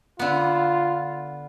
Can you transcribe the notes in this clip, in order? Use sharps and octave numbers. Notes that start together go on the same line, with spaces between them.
D3 B3 F4